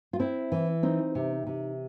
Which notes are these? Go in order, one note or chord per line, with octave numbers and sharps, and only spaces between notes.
F4
C4 E4
E3
C4 D#4
C3
C3